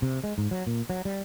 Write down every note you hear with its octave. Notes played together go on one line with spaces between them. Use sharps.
C3
G#3
G#2
F#3
A#2
F#3
G3